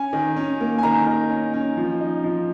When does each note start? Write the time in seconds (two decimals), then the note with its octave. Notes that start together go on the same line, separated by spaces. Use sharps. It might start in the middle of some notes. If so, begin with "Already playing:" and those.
Already playing: C#4 G#5
0.13 D#3
0.36 C#4
0.60 A#3
0.78 G#5
0.83 D#3 A#5
1.06 D#3
1.30 C#4
1.53 C#4
1.77 F3
2.00 D#4
2.24 F3